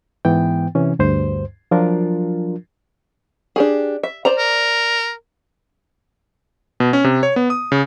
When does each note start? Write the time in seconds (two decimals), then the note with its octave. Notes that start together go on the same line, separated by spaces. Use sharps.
0.25 G#2 E3 B3 G5
0.75 C3 E3 C#4
0.99 D2 G2 C5
1.71 F3 F#3 D4 F4 A#4
3.56 D4 G4 G#4
4.03 E5
4.25 C5 D5 A#5
4.39 A#4
6.80 B2
6.93 C#4
7.04 C3
7.23 C#5
7.36 B3
7.50 D#6
7.72 C#3